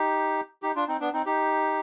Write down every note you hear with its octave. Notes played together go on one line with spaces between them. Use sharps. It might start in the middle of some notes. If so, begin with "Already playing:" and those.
Already playing: D#4 G4
D#4 G4
D4 F4
C4 D#4
B3 D4
C4 D#4
D#4 G4